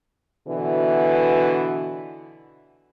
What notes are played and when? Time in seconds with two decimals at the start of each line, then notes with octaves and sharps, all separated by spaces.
0.47 B2 D3 E3